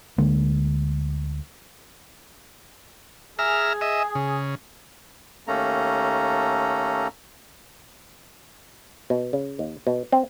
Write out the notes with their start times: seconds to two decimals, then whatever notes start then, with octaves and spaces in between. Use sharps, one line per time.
0.18 D2 D3 G#3 A#3
3.39 G#4 E5 A#5 F6
3.81 D#5 E5
4.15 C#3
5.48 D#2 A3 A#3 C#4 A4 A#5
9.10 B2
9.33 C#3
9.59 D#2
9.87 B2
10.12 C4